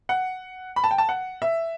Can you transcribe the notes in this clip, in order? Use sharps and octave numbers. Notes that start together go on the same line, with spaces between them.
F#5
B5
A5
G5
A5
F#5
E5